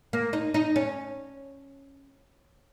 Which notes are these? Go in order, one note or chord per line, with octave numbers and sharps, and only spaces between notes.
A#3
D#4
D#4
C#4